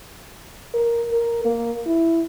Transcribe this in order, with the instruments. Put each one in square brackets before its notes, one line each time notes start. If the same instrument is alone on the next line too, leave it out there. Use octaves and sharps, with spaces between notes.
[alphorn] A#4
A#4
A#3
E4